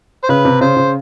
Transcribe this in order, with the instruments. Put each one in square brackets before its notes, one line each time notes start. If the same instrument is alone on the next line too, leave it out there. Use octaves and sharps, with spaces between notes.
[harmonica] C5
[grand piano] C#3 [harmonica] B4
[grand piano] C3
[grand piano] C#3 [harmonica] C5
[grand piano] C#3